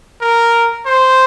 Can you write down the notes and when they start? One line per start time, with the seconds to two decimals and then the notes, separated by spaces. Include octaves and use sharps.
0.21 A#4
0.86 C5